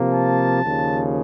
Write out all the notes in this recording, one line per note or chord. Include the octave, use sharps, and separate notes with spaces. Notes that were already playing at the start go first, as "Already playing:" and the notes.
Already playing: C3 F3 A#3
A5
D#2 C#3 F3